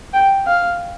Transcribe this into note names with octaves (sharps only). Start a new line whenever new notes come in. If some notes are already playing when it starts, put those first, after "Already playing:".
G5
F5